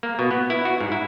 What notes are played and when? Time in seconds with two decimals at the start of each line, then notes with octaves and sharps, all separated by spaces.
0.03 A#3
0.19 B2
0.31 B3
0.50 E4
0.65 F#4
0.80 G#2
0.92 E4